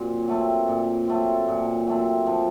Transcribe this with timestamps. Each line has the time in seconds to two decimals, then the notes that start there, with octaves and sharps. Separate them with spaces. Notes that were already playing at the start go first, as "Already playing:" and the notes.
Already playing: A#2 F#3 C4
0.28 F#3 A3 C4
0.68 A#2
1.08 F#3 A3 C4
1.47 A#2
1.87 F#3 A3 C4
2.27 F3